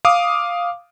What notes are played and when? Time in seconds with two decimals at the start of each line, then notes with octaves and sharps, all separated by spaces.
0.05 F5 D6 D#6